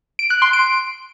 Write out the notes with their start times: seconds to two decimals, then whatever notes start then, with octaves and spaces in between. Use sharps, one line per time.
0.19 D7
0.30 F#6
0.42 C6
0.53 D7